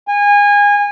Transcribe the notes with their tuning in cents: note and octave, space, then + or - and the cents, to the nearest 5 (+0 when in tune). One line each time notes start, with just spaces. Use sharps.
G#5 -25